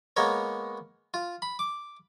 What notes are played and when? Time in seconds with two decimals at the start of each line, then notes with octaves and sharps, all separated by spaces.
0.17 G#3 A#3 B3 A#4 C#5
1.14 F4
1.42 B5
1.59 D6